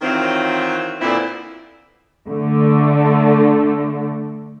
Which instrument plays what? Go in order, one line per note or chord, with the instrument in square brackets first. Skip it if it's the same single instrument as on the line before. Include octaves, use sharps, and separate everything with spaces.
[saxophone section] D#3 E3 F#3 C4 F4
A#2 D3 B3 C4 E4
[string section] D3 A3